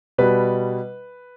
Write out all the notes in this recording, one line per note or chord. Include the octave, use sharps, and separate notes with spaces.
B2 G3 B4